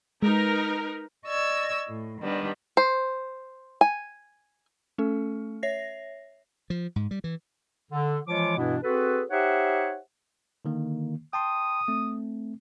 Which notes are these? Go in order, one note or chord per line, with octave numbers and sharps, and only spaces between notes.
G#3 D#4 A#4 B4
D5 D#5 C#6 E6 G#6
A2
D#3 G3 B3 D4
C5
G#5
A3 C#4 A4
C#5 E5 A#6 C7
F3
G#2
G3
E3
D3
E3 F3 G#3 F4 C#5 D6
G2 B2 E3 B3 D4 E4
C4 F#4 G#4 A4 B4
D#4 G4 C5 C#5 E5 F#5
D3 D#3 A#3
G5 A5 C6 D#6
A3 C4